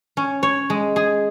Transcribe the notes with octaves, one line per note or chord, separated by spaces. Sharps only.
C#4
C#5
G#3
G#4